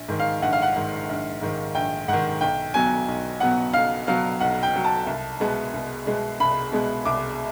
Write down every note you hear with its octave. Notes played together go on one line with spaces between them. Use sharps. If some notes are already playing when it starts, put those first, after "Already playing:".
Already playing: A#1
G#2 D#3
F5
A#1 F#5
F5
F#5
G#2 D#3
A#1
G#2 D#3
A#1 G5
G#2 D#3 F#5
B1 G5
B2 F#3 B3 G#5
B1
B2 F#3 B3 F#5
B1 F5
B2 F#3 B3 F5
B1 F#5
G5
B2 F#3 B3
A5
C2
B2 G#3 B3
C2
B2 G#3 B3
C2 B5
B2 G#3 B3
C2 D6